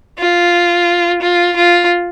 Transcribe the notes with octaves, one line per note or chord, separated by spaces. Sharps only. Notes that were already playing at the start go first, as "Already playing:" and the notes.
F4
F4
F4